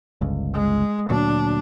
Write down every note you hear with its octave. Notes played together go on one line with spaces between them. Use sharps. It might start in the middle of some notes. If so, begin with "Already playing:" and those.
G1 C#2
G#3
D2 A#2 F#3 D4